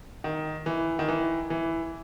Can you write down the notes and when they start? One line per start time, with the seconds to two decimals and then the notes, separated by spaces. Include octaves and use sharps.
0.24 D#3
0.66 E3
0.99 D#3
1.08 E3
1.50 E3